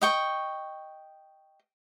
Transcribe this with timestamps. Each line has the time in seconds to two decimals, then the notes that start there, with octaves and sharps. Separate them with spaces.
0.01 D#5 G5 C#6